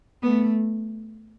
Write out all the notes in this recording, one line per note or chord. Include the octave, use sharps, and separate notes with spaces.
A3 B3